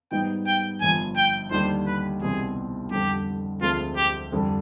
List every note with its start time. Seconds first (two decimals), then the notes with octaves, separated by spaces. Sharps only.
0.11 G#2 G3 B3 D#4 G5
0.47 G5
0.81 G1 G2 F3 G#5
1.17 G5
1.51 D#2 D3 G3 D4 G4 C5
1.86 B4
2.21 C2 B2 G3 C4 G#4
2.91 F2 D3 G3 G4
3.61 D2 D3 F3 G#3 C4 F4
3.97 G4
4.32 F2 D3 G3 D4